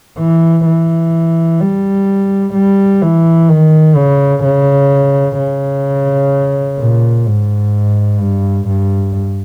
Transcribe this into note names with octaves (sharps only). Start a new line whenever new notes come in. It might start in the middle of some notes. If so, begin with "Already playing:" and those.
E3
E3
G3
G3
E3
D#3
C#3
C#3
C#3
A#2
G#2
G2
G2